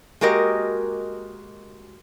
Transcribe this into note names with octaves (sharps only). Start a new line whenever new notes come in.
G#3 A#3 F#4 G4 A#4 D#5